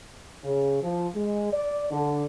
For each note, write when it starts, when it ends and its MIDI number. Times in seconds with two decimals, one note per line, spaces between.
0.44 0.81 49
0.83 1.07 53
1.15 1.51 56
1.52 1.89 74
1.90 2.24 50